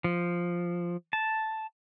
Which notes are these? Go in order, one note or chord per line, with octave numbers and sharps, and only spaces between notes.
F3
A5